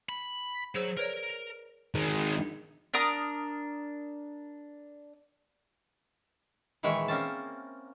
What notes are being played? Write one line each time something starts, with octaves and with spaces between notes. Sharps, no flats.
B5
F#3 G#4 C5 E6
A#4 B4 C#5 D5
D#3 G#3
D4 A#4 A#5 D#6
A#2 D#3 E3 G#3 E4 C#5
A#3 C4 C#4 A5